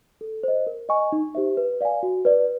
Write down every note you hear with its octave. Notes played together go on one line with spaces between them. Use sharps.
A4
C5 D#5
A#4
D#5 G#5 C#6
D#4
G4 C5 E5
B4
D5 F5 G#5
F#4
B4 D5